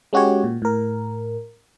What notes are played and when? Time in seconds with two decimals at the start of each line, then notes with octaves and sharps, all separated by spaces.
0.13 G#3 C#4 F#4 G4 C#5
0.44 A#2
0.62 A2 A#4